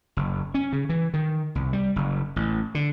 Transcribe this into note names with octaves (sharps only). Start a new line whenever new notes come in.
F#1
C#4
C#3
E3
D#3
C2
G3
F#1
A1
D3